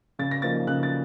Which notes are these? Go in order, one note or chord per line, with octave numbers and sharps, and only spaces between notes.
C#3 A6
A#6
F3 A#3 D#4 A6
C#3 F#6
A6